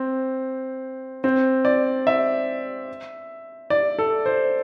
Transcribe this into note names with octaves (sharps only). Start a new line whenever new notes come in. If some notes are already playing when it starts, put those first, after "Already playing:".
Already playing: C4
C4
D5
E5
D5
A4
C5